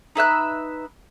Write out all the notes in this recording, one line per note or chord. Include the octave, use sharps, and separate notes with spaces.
D#4 B4 E5 F#6